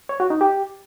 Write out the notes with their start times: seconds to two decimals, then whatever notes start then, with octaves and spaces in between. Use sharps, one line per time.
0.09 C#5
0.20 F#4
0.30 D#4
0.41 G4